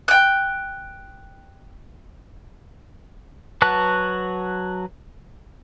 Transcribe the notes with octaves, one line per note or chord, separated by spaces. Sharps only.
G5 F#6
F#3 F#4 B4 A5 F#6